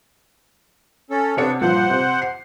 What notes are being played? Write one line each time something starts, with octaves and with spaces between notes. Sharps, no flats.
C#4 A4
C3 B3 D4 A4 C#5 C#7
G2 A#2 F3 C5 F#5
C3
C7